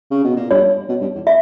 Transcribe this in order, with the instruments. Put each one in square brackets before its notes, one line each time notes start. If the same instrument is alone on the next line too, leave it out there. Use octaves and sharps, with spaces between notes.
[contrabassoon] C#3
B2
A#2
[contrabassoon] G2 [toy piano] C#5
[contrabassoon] B2
G2
E2
[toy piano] E5